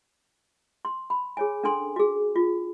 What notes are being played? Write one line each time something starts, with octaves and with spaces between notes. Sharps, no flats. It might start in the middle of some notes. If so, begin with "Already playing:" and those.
C6
B5
G#4 C#5 G#5
C#4 D4 A4 G#5 C6
F#4 G#4
F4